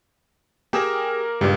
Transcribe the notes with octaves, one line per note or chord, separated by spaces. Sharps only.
A#3 G4 G#4 A#4 E6
C#2 G2 A#2